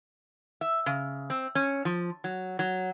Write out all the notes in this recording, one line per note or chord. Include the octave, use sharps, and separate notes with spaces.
E5
C#3
C4
C#4
F3
F#3
F#3